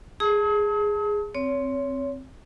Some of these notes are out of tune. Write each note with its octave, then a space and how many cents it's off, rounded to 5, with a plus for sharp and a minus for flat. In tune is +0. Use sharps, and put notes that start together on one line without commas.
G#4 -5 A5 +0 D#6 +45
C4 +0 C#5 +25